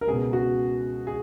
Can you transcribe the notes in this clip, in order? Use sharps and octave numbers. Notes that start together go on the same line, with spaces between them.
A#4
C#2 B2 G#4
F#4
G#4